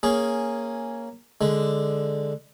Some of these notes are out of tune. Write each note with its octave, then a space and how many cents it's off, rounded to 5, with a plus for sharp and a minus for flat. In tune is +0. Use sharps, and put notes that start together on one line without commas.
A#3 +0 C#4 +0 G#4 +0
D3 +0 G#3 +0